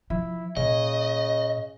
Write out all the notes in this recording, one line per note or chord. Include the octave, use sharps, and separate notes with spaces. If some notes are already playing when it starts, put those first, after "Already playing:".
F3 E4
A#2 C#3 D#5